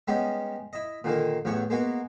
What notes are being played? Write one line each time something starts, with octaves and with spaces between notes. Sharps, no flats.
G3 G#3 B3 C#4 D#4 G4
E4 D#5
A#2 D3 D#3 A#3
A1 E2 B3 C#5 C#6
G#3 A#3 B3 F#4